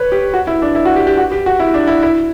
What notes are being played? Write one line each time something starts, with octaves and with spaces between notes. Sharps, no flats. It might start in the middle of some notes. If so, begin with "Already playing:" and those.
Already playing: B4 C#5
G4
F#4
E4
D4
E4
F#4
G4
G4
F#4
G4
F#4
E4
D4
E4
E4